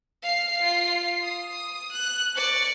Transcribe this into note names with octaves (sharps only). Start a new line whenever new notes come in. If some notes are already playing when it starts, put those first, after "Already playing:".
F5 C7
F4 C7
D#6
F#6
D5 C#6